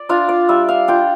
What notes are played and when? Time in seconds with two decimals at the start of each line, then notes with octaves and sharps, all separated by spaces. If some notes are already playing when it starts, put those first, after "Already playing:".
Already playing: D5
0.09 D4 F4 F5
0.29 D5
0.49 G3 E5
0.69 F5
0.88 D4 F4 G5